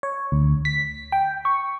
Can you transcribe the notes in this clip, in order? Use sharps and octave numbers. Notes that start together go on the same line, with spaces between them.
C#5
D2
B6
G5
C#6